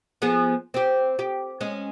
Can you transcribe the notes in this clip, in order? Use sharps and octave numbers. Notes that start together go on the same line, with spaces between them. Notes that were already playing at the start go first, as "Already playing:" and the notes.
F3 B3 G#4
C4 G4
G4
G#3 C#4